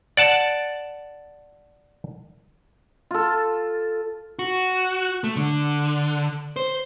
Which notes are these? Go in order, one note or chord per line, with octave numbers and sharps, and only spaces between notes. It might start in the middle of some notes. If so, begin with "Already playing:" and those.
D5 F#5 A5
F4 A4
F#4
A3
D3
C5